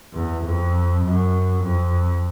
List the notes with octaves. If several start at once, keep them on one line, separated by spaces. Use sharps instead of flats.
E2
F2
F#2
F2